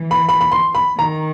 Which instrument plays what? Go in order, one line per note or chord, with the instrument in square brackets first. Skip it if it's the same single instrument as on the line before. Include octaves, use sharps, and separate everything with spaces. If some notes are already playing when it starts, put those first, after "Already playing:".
Already playing: [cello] E3
[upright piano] B5
B5
B5
C6
B5
[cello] D#3 [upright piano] A#5